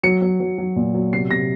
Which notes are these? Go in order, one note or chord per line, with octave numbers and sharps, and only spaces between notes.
F#3 C#7
F#3
F#3
F#3
A#2
F#3
C3 C7
C3 A#6